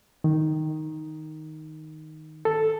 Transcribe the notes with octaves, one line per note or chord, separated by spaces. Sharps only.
D#3
A4